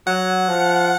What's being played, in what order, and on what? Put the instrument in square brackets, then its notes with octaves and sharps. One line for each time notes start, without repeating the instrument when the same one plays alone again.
[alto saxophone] F#3 [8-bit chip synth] F#5
[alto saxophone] F3